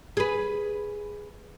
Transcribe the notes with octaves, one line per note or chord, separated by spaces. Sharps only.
G#4 B4